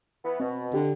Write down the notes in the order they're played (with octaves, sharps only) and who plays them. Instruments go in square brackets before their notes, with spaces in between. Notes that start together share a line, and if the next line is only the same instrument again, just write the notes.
[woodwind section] E3 B3
[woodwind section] B2 [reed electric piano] C4
[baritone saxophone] D3 [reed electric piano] G4